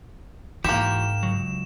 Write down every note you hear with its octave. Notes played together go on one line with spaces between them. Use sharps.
G#2 E3 A#3 F#4 G4 C5 E7
C#2 F#3